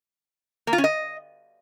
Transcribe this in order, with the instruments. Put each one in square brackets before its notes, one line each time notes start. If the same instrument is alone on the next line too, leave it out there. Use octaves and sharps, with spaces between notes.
[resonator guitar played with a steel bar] A#3
F4
C#4
D#5